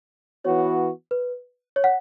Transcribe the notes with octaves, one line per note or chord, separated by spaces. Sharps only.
E3 B3 F#4 C#5
B4
C#5
F#5